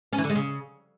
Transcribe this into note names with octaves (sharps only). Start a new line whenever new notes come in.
C#4
E3
D3
G#3
C#3